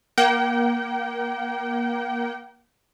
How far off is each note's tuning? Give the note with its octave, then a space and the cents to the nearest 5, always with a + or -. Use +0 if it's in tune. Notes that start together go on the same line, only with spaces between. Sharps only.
A#3 +25 G5 -35